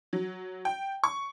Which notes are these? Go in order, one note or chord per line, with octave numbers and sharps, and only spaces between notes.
F#3
G5
C#6